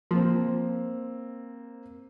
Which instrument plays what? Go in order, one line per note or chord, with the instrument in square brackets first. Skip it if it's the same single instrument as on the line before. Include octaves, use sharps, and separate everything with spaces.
[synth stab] F3 [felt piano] A#3 C4